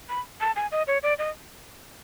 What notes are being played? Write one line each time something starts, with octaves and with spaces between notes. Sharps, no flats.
B5
A5
G#5
D#5
C#5
D5
D#5